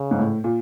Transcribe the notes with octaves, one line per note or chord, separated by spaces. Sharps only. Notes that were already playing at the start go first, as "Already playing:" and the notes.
Already playing: C#3
G#2
A2
A#2